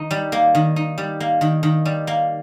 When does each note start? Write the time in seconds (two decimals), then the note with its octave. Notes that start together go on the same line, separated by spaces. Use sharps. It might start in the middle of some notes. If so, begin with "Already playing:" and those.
Already playing: D#3 D#4
0.11 G3
0.32 A#3
0.55 D#3
0.76 D#4
0.98 G3
1.20 A#3
1.41 D#3
1.63 D#3
1.85 G3
2.07 A#3